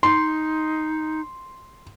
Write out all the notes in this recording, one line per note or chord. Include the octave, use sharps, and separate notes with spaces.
D#4 C6